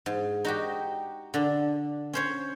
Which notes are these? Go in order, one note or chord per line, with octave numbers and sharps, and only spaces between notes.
G#2
D#4 F#4 G4
D3 D4
C#4 C5 C#5